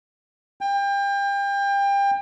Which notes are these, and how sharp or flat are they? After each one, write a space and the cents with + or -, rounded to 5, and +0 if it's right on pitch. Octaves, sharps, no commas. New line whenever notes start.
G5 +30